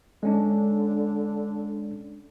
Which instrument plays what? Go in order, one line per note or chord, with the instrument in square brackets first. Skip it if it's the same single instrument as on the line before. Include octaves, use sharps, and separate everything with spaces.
[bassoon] D3 [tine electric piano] G#3 C#4 D4